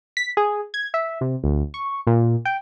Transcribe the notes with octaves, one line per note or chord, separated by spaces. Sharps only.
B6
G#4
G#6
E5
C3
D2
C#6
A#2
G5